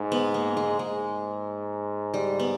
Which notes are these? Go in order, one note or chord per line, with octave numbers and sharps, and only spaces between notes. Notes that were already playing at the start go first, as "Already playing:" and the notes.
Already playing: G#2
B3
A#3
G#3
G#2 G#3
G3
B3